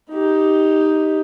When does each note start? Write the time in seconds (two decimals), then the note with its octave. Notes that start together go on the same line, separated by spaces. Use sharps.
0.12 D#4 G4